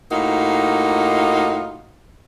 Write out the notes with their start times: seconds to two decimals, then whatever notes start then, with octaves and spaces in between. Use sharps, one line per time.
0.11 A2 A#3 D#4 F4 F#4